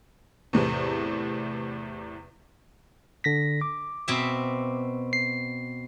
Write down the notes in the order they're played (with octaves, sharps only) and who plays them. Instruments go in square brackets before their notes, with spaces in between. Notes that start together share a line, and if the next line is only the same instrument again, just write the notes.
[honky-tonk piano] E2 A2 C3 E3
[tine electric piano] D3 A#6 B6
D6
[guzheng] B2 C4 E5
[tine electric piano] C7